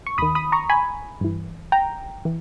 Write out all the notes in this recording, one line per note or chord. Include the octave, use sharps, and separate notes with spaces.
C#6
D#2 D#3 B5 D#6
B5 D#6
A#5 C#6
G#5 B5
G2 E3
G5 A#5
E3